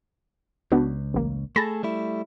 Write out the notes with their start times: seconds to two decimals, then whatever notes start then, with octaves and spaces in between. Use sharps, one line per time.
0.72 C#2 B3 D4 F#4
1.14 A1 A#3
1.56 A3 G#4 A4 B5 A6 A#6
1.83 G3 A3 E4